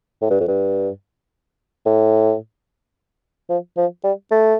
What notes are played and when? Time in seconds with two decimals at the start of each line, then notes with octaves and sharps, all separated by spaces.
0.22 A2
0.30 G2
0.40 F2
0.48 G2
1.86 A2
3.49 F3
3.77 F3
4.04 G3
4.31 A3